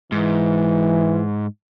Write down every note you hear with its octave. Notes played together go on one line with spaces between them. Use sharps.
G#2 E3